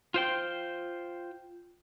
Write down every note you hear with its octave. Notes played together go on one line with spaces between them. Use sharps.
F4 C5 G5